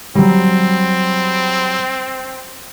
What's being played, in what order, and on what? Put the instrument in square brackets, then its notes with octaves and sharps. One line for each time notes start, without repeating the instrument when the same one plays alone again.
[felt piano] F#3 G3 [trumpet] C4